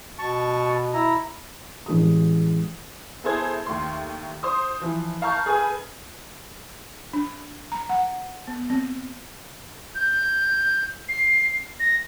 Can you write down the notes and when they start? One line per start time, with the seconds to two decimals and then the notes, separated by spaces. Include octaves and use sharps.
0.19 B2 A5 C#6
0.94 E4 A#5
1.86 A1 G#3 D#6
3.24 B3 E4 G#4 A4 C5 G#6
3.66 D#2 A3 C6
4.43 C5 C6 D#6
4.81 E3 F3
5.22 F5 A5 A#5 C#6 F6 G6
5.46 G#4 A4 B4 G#5
7.13 D4
7.72 A#5
7.89 F#5
8.47 B3
8.70 C4
9.95 G6
11.09 C7
11.80 A#6